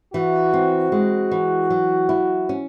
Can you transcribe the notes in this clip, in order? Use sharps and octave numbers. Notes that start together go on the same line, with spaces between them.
E3 F#4
C4
G#3
E3
F#3
E4
C#4